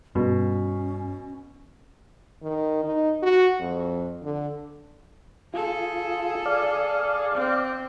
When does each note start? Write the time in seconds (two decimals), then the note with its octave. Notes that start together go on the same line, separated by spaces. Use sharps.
0.15 G2 B2 C#4
2.43 D#3
2.84 D#4
3.23 F#4
3.60 F2
4.23 D3
5.54 F4 G#4 A4
6.46 D5 F5
7.34 C4